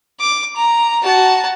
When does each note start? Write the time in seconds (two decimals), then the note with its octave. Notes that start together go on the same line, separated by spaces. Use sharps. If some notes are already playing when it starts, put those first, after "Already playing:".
0.20 D6
0.56 A#5
1.03 F#4 A5